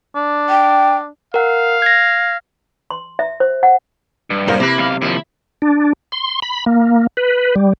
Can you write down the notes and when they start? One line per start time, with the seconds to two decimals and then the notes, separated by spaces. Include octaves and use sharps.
0.16 D4
0.49 G5
1.34 A#4 F5 F#5
1.82 G#6 A#6
2.91 C6
3.19 E5
3.40 C5
3.63 F#5
4.30 G2
4.48 F#2 A2 C3 A#3 A#4 C5
4.60 C3 A#3 E4 B4
4.78 B1 F5
5.01 D#2 F3 E4
5.62 D4
6.12 C6
6.42 B5
6.66 A#3
7.17 B4
7.56 G3